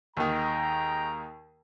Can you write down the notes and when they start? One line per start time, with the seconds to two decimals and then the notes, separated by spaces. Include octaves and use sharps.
0.17 D#2 D#3 G#3 G5 A#5